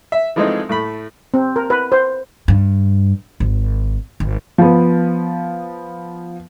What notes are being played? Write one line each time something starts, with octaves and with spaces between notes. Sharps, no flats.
E5
E3 F3 G#3 A3 C4 D#4
A2 A3 B5
C4
A#4
B4
C5
G2
G#1
G#1
F3 B3